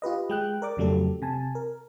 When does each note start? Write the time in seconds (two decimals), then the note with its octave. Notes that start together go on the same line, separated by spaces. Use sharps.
0.02 F4 G4 B4 D#5
0.30 G#3 G5 F#6
0.62 A#4 D5 D6
0.77 F2 C#3 F#3 A3 G4 A4
1.22 C3 G#5 A5
1.55 A#4